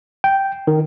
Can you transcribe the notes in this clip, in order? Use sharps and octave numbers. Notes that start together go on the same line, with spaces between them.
G5
D#3